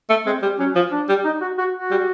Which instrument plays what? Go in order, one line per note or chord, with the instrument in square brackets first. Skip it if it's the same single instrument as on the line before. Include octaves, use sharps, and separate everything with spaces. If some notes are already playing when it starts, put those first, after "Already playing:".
[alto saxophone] A3
[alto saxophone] G#3 [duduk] C4
[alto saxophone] G3
[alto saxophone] F#3 [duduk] C#4
[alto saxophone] F3
[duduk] D4
[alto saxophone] G3
[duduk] D#4
F#4
F#4
F#4
[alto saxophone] G3